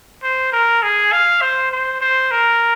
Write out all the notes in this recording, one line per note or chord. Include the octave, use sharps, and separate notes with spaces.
C5
A#4
G#4
F5
C5
C5
C5
A#4